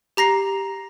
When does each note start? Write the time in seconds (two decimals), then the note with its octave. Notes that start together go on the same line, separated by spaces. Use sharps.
0.17 G4 A#5 A#6 C7